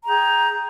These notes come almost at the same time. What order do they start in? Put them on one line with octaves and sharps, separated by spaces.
A#5 G#4 G5